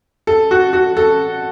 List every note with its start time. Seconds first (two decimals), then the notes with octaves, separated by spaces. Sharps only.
0.27 A4
0.51 F#4
0.73 F#4
0.97 A4